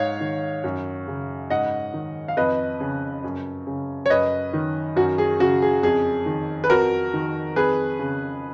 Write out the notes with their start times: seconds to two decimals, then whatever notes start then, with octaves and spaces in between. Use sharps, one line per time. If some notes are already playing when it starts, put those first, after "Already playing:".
Already playing: G#2 C#5 F5
0.20 D#3
0.64 F#2
1.08 C#3
1.50 G#2 D#5 F#5
1.94 D#3
2.28 F5
2.37 F2 B4 D#5
2.80 C#3
3.24 F#2
3.67 C#3
4.06 C#5
4.10 F#2 B4 D#5
4.53 D#3
4.96 F#2 F#4
5.18 G#4
5.40 C#3 F#4
5.62 G#4
5.83 F2 G#4
6.26 D#3
6.64 B4
6.69 F2 F#4 A#4
7.14 D#3
7.56 F2 G#4 B4
7.99 C#3